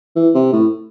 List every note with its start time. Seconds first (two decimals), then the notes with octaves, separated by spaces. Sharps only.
0.16 E3
0.34 C3
0.53 A2